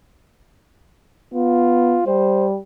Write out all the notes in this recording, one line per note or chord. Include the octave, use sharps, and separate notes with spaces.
B3 F4
G3 C5